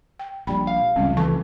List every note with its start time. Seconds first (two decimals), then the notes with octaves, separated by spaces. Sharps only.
0.19 G5
0.47 A#1 G3 G5 B5
0.67 F5
0.96 F1 C#2 G3 C4 C#4
1.17 E3 A4 A5 C#6